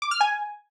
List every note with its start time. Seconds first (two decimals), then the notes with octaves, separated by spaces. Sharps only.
0.02 D6
0.11 F6
0.21 G#5